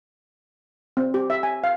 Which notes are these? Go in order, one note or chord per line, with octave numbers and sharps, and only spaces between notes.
C4
G4
E5
G#5
F5